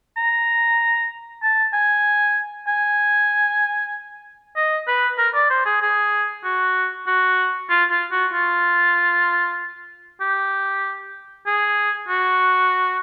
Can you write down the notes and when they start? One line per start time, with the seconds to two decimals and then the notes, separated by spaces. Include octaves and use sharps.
0.17 A#5
1.43 A5
1.73 G#5
2.68 G#5
4.56 D#5
4.87 B4
5.18 A#4
5.35 D5
5.50 C5
5.66 G#4
5.82 G#4
6.44 F#4
7.07 F#4
7.70 F4
7.90 F4
8.12 F#4
8.33 F4
10.21 G4
11.47 G#4
12.09 F#4